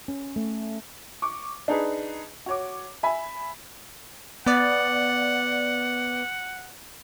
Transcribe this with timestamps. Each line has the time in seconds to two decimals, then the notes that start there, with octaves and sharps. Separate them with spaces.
0.08 C#4
0.36 A3
1.22 C#6 D6
1.68 D4 D#4 G#4 B4
2.46 F#4 C#5 D6
3.03 E5 G#5 B5
4.46 B3 D5 F#5